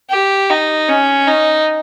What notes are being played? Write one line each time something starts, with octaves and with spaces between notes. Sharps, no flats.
G4
D#4
C#4
D#4